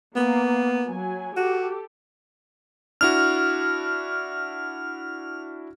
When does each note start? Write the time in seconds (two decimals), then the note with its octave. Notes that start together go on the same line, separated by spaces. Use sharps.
0.16 A#3 B3
0.89 F#3 G#5
1.36 F#4 G4 A4
3.01 D4 E4 F#4 F6